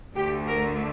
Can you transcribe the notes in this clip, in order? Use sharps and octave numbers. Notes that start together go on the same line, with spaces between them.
D2 D3 A3 G4
A#4